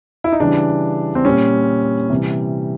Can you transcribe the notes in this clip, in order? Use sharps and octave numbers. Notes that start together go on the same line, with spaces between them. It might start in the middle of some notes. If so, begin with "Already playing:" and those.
E4
D#4
C#3 E3 G3 D4
C4
A#2 G3 C#4
C3 E3 G3